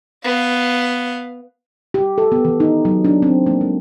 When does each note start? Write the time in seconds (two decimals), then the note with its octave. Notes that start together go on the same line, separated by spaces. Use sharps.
0.25 B3 F5
1.94 G4
2.18 A4
2.32 B3
2.45 E3
2.60 D#4
2.85 F#3
3.05 D4
3.22 C4
3.47 A#3
3.61 G#3